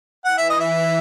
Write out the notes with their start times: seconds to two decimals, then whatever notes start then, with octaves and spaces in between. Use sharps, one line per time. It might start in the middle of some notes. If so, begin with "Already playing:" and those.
0.25 E3 F#5
0.38 E5
0.50 D#5
0.60 E5